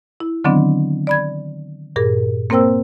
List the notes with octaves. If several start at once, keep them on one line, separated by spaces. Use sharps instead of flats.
E4
D3 D#3 F#3 B3 C4 D4
D5 B5 G#6
G2 A#2 G#4 A#4
A#3 C4 A#4 C5 G5 E6